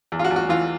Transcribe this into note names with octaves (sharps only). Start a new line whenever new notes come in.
E2
F4
F#4
E2
F#4
E3 F4